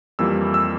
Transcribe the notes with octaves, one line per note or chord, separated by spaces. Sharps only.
F2 E3 G3 A#3 E6
E6